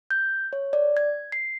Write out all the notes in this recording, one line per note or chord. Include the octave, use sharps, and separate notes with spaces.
G6
C#5
D5
G#6
C7